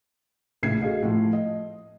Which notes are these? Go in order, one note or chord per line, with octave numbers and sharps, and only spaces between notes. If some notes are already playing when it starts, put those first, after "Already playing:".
A#1 A2 C#3 G#6 C7
F#4 G#4 A4 D#5 F5
A2 F3
D#5